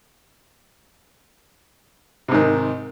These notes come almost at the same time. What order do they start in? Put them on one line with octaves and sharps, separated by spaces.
C3 G#2 D#3